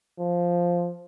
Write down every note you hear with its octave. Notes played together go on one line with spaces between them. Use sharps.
F3